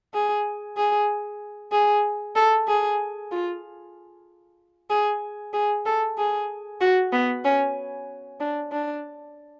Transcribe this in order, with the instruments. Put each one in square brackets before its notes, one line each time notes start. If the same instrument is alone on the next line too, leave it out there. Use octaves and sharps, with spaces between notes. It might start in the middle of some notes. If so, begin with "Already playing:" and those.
[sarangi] G#4
G#4
G#4
A4
G#4
F4
G#4
G#4
A4
G#4
F#4
B3
C#4
D4
D4